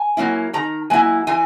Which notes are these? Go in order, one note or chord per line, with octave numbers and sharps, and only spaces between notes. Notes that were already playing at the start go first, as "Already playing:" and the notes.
Already playing: G#5
F#3 A#3 C#4 E4
D#3 A#5
F#3 A#3 E4 G#5
E3 G#5